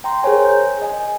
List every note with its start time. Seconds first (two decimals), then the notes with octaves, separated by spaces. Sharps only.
0.04 G5 A#5 C6
0.23 G#4 A#4 C5 C#5 G#5
0.45 G6
0.82 D#5 G#5